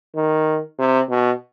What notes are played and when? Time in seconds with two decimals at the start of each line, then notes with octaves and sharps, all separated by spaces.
0.16 D#3
0.79 C3
1.10 B2